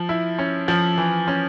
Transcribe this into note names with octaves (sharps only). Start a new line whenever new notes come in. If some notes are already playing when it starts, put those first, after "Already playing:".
Already playing: F3
E4
C#4
F3
E3
C#4